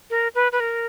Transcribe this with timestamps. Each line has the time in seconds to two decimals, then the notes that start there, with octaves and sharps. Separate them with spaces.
0.10 A#4
0.35 B4
0.52 B4
0.60 A#4